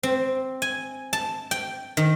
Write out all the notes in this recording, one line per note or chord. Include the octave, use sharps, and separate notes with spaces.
C4
G#5
A5
G5
D#3